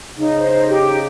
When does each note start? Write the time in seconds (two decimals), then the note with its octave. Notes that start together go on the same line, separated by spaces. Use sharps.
0.17 C#3 D#4
0.35 C5
0.51 D#4
0.68 G4
0.85 D#4